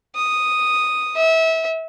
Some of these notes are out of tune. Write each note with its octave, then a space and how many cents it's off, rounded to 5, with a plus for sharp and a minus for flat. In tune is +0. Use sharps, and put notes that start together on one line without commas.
D#6 -5
E5 -25